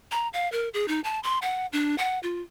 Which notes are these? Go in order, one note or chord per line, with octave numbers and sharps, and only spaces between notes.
A#5
F5
A#4
G#4
D#4
A5
C6
F#5
D4
F#5
F4